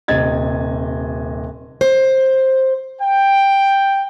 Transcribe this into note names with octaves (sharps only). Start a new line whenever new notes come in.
D#1 C3 D#5 G#6 A6
C5
G5